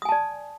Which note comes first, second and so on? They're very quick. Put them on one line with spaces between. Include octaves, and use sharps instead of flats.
D#6 G#5 A5 D5